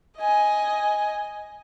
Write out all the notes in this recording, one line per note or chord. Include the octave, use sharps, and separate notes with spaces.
D#5 G#5